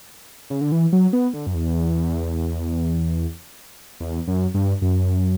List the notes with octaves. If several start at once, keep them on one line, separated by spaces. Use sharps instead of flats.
C#3
D3
E3
F#3
B3
D3
F#2
E2
E2
F#2
G2
F#2